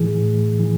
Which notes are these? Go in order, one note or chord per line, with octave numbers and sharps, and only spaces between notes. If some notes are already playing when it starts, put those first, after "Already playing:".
Already playing: A2 E3 G#4
A2
E3